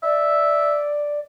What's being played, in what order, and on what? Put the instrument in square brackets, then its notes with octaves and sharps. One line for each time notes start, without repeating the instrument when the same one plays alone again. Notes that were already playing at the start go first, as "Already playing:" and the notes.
[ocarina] D5 [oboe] E5